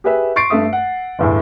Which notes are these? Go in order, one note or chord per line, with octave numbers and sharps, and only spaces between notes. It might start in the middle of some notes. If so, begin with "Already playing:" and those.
G4 G#4 B4 E5
C6 C#6 A6 C7 D7
G2 A3 E5 D#6
F#5
G1 E2 A2